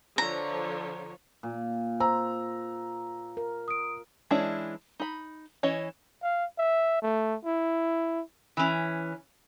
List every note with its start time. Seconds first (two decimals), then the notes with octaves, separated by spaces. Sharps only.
0.18 D3 F3 C#5 A#5
1.43 A#2
2.00 C5 A#5 E6
3.37 A#4
3.68 D#6 D7
4.31 E3 G#3 C#4 D4 E4
5.00 D#4 B5
5.63 E3 C#4 C#5 D#5
6.22 F5
6.58 E5
7.02 A3
7.45 E4
8.57 E3 C#4